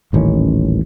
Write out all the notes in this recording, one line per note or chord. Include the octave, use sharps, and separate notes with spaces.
D#1 A1 D#3 C#4